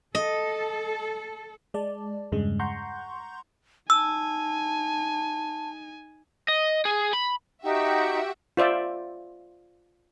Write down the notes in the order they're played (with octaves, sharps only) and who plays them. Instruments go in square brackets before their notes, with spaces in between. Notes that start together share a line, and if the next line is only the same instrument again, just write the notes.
[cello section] A4 [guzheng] D#5
[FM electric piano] G#3 D5 A5
E2 G2 C#3 G#3
F#5 A#5 C6 C#6 G6
[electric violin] D#4 G#5 [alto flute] A5 [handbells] E6
[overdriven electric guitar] D#5
G#4
B5
[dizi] D#4 [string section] F#4 E5 [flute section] G4 F#5 G5
[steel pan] F4 C5 D5 E5